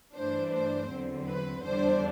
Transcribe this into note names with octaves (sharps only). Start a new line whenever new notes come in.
G2 E3 A3 D4 C5
C5
E2 D3 F#3 C4
B4
E2 D3 G3 D4 C5